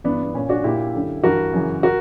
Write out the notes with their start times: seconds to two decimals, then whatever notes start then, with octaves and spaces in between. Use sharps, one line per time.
0.04 G2 E3 B3 D4
0.23 B3
0.34 A#2 C#4
0.49 D4 F#4
0.64 A#2 E4 G4
0.94 F#2 D3
1.24 G2 E3 F#4 A#4
1.53 F#2 C#3 E3
1.83 F#4 A#4